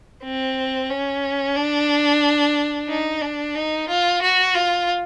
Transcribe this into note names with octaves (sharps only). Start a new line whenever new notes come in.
C4
C#4
D4
D#4
D4
D#4
F4
F#4
F4